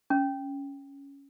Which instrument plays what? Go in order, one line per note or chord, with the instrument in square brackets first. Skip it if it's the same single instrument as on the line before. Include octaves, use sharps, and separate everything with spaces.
[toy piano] C#4